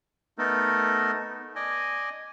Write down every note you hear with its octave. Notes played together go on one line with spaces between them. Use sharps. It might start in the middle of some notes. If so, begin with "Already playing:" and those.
A3 B3 D#4 A4 A#4
D5 D#5 G#5